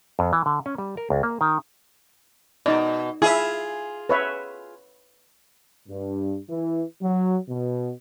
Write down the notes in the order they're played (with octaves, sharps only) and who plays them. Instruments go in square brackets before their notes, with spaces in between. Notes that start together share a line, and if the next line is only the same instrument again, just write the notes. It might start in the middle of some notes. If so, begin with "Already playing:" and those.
[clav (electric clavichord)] F2
E3
D3
C#4
G3
A#4
C#2
A#3
D#3
[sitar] B2 [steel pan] D#4 D5
[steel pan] E4 E5 [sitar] F4 G#4
[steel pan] B4 C#5 E5
[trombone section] G2
E3
F#3
B2